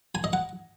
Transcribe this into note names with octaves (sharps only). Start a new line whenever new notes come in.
G#5
D#5
F#5